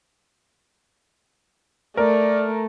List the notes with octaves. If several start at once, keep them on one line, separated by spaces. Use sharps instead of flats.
A3 A#4 D5